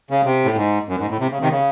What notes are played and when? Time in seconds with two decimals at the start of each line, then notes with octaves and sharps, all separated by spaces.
0.11 C#3
0.25 C3
0.45 A2
0.57 G#2
0.89 F#2
0.99 G#2
1.10 A2
1.20 C3
1.31 C#3
1.41 C3 D#3
1.51 C#3